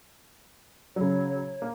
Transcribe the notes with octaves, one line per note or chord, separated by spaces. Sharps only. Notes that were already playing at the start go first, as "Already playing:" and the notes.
C#3 F#3 C#5
A#3